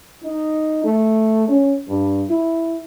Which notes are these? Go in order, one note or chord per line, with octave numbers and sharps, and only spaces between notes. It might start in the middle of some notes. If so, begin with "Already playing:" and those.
D#4
A3
C#4
G2
E4